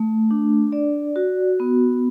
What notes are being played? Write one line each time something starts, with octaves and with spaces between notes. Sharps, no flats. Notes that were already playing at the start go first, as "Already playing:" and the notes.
Already playing: A3
D4
D5
F#4
B3